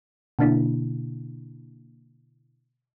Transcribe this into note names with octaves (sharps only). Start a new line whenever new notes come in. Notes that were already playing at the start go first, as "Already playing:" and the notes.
B2 D3 A#3 D4 E4